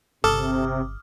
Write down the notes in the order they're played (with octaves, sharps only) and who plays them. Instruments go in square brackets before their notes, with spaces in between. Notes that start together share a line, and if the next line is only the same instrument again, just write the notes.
[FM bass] G1 [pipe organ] C3 [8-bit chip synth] A4 [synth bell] D6 D#6 F6